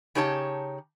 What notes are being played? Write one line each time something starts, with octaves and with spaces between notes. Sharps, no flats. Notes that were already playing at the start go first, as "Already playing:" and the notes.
C#3 D#4 G4 C#5 A5